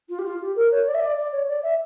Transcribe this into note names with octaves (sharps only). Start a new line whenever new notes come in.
F4
G4
F4
G4
A#4
C#5
D5
E5
D5
D5
C#5
D5
E5